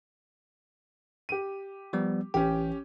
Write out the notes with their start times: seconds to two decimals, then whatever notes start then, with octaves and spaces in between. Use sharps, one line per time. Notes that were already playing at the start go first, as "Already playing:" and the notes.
1.29 G4 D#7
1.93 F3 G3 B3
2.34 A1 E3 C#4 G4 G5